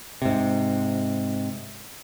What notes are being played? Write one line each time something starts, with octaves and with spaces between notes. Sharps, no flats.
G#2 C3